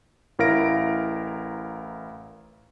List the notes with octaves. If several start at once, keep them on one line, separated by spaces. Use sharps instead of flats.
A1 E4 A#4 F5 A#6 D7